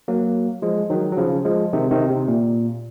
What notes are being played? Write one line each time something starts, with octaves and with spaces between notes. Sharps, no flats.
F#3 A#3
F3 G#3
D#3 F#3
F#3
C#3 F3
F3 G#3
C3 D#3
C3 D#3
C3
A#2